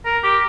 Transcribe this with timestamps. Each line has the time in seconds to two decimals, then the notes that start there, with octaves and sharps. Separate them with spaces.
0.05 A#4
0.23 G4